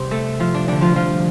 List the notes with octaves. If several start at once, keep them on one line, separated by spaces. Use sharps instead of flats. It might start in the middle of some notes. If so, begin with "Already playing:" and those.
Already playing: C3 G3 C4 G4 C5
A3 A4
F3 F4
D4
D3 G3 D4
F3 F4
F3 F4